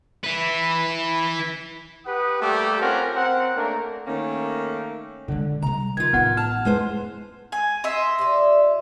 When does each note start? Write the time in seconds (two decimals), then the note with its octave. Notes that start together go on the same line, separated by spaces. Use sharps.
0.24 E4 B4
2.05 G4 B4 F#5 D#6
2.40 G3 A3 A#3 G4 G5 D6
2.79 C4 C#4 F4 A#4 F#5
3.14 C4 A#4 F#5
3.55 A3 A#3 C#4 D4 A#4
4.07 D#3 A3 A#3 C#4
5.28 D3 G#3
5.62 C3 G3 A#5
5.97 D#3 F3 F4 G#6
6.13 A1 B3 D#4 F#5
6.37 A5 F6
6.65 E2 G#3 B4 C5
7.52 G#5
7.84 D#5 E5 C6
8.19 C3 F4 D5